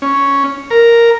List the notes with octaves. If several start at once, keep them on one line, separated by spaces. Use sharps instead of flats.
C#4
A#4